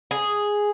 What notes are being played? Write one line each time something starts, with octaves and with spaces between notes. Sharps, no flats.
G#4